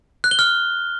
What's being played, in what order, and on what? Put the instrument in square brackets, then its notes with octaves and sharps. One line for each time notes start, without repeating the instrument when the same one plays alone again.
[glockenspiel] F#6
G7
F6